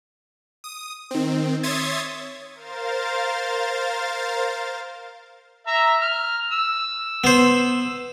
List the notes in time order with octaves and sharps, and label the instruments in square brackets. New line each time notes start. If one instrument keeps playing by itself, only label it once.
[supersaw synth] D#6
D#3 C4
C#5 E5 C6 D#6 G#6 A6
A#4 C5 F5 A6
[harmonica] E5 A#5
F6
E6
[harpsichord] B3 C5